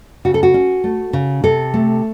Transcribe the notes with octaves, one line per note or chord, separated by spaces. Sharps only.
C#3 F#4
A4
F#4
C#4
A3
C#3
C3 A4
A3